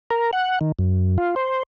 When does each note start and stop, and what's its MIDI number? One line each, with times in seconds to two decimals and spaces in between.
0.10 0.31 70
0.33 0.59 78
0.61 0.72 51
0.79 1.18 42
1.18 1.35 65
1.36 1.63 72